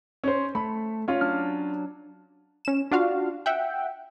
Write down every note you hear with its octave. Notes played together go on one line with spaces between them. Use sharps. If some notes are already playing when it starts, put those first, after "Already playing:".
C#4 C5
A3 B5
C#4 F4
F#3 D4 F6
C#4 E7
D4 F4 F#4 F5
E5 F#5 G5